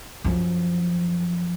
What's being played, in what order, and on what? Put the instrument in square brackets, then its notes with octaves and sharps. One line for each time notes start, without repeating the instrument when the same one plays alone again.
[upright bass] F#2 F3